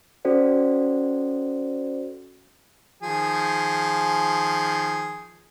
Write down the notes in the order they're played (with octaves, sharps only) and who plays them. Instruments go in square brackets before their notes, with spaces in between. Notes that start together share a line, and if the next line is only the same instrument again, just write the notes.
[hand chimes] C#4 F#4 A4 C5 D5
[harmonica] D#3 F3 G#4